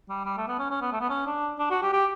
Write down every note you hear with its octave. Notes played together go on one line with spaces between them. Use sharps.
G3
G3
A3
B3
C#4
C#4
B3
A3
B3
C#4
D4
D4
F#4
G4
G4